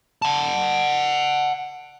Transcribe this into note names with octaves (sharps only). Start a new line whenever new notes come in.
F#5 A5